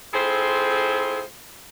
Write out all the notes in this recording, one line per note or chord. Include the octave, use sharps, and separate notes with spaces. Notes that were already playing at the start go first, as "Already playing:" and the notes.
C4 E4 F4 G#4 A4 C5